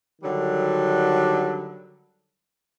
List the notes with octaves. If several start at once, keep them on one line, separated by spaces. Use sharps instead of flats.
D3 D#3 F#3 G3